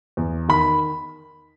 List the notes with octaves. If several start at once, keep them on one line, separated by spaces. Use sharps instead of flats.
E2
D#3 B5